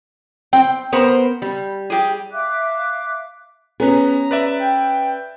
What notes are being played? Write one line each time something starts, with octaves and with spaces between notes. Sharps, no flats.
C4 G5
B3 A#4 C5
G3
G4 G#4
E5 F5 D6 F#6
B3 C#4 G#4 B4 A#5
B4 D5 E5
G5